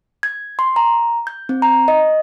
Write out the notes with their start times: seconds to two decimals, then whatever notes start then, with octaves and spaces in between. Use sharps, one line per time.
0.23 G#6
0.59 C6
0.76 A#5
1.27 G6
1.49 C4
1.62 A#5
1.88 D#5